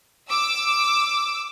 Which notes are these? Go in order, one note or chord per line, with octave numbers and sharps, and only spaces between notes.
D6 E6